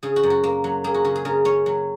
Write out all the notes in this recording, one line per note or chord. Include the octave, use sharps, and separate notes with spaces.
C#3 G#4
F#4
F#2
F#4
A#3
F#3
A#3 G#4
F#4
C#3 F#4
G#4
C#3 A#4
C#4 C#5
F#3